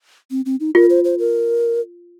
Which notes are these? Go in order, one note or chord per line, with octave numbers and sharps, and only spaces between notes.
C4
C4
D#4
F4 A#4
C5
C5
A#4